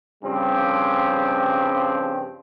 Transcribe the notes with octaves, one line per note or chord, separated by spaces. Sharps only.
G2 C#3 F3 G3 C4